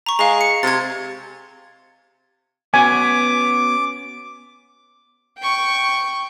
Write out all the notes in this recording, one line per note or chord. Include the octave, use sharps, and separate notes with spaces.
A#5 C#6
G#3 F5 A#5
C#7
C3 G#6 A6
B3 C#4 F#4 G#5 D6
G5 C#6